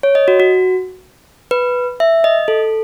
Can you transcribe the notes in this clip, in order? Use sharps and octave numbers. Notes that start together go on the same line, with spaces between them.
C#5
D#5
F#4
F#4
B4
E5
D#5
A4